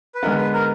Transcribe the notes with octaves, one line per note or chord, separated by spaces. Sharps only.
B4
D3 G#3 B3 A#4
B4
A#4